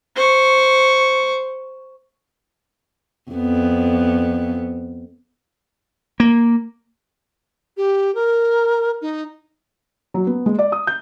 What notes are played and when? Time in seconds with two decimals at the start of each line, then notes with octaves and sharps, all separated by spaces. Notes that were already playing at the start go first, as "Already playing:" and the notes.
0.15 C5 C#6
3.31 F2 B3
6.20 A#3
7.77 G4
8.15 A#4
9.01 D#4
10.14 F#3
10.27 B3
10.46 G#3
10.59 D5
10.72 D#6
10.87 G6